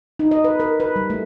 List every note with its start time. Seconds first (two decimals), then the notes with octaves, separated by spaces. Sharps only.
0.19 D#4
0.31 D#5
0.44 B4
0.60 A#4
0.80 B4
0.96 G3
1.10 A3